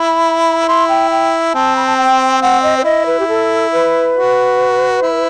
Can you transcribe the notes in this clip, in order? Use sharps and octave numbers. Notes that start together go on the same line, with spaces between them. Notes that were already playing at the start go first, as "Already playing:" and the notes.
Already playing: E4 B5
B5
E4 C6
G5
G5
C4 A5
B5
A5
G5
C4 F#5
D#5
C5
E4 D#5
B4
G4
A4
B4
F#4
E4